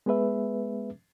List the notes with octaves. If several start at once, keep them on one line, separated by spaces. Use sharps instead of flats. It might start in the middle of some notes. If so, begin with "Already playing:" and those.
G#3 B3 G#4 B4 E5